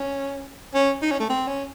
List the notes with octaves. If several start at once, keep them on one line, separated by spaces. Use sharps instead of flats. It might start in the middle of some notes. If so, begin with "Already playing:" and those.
Already playing: C#4
C#4
D#4
C#4
A3
C4
C#4